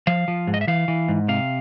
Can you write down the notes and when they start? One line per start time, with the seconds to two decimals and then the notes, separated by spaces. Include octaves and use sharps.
0.07 F3 F5
0.28 F3
0.47 G#2
0.54 D#5
0.61 E5
0.67 E3 F5
0.88 E3
1.08 G#2
1.28 C3 F5